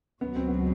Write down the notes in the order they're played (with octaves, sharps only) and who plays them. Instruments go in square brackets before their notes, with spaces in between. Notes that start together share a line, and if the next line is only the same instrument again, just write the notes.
[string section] C#2 B2 F#3 [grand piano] B3
[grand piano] C4
B3